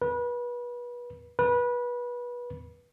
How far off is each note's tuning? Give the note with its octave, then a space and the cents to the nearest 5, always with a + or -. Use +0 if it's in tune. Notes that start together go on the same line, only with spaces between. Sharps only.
B4 -30
B4 -25